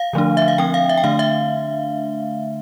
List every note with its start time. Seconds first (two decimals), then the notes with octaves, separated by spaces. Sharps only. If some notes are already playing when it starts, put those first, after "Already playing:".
Already playing: F5
0.13 D3 F3 A3 D4
0.37 E5
0.48 F5
0.58 F3 C4 G5
0.74 F5
0.89 E5
0.97 G5
1.04 D3 A3 D4 F5
1.19 E5